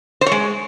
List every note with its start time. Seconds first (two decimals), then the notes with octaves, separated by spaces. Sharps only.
0.21 C5
0.26 C#5
0.32 G#3